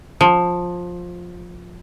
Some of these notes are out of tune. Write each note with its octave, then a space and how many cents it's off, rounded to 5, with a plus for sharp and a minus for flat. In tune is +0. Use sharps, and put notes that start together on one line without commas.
F3 +15